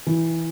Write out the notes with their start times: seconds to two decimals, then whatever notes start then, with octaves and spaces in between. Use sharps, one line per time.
0.07 E3